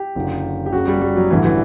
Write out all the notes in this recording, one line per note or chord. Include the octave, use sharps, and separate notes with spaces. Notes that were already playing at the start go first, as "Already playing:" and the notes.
Already playing: G4
F#1 F#2 D3
G4
F#1 F#2 C#3 F#4
G3
G3
F#3
A1 G2 D3 E3
E3